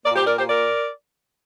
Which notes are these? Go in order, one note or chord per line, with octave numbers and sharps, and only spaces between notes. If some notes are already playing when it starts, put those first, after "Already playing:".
A#2 A#3 A#4 D5
G4 C5
A#4 D5
G4 C5
A#4 D5